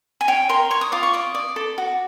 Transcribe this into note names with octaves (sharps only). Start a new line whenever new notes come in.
G#5
C#5 G5
A#4 C6
C#5 C#6
D#6
F4 D6
C#6
D5 D#6
D5
A4
F#4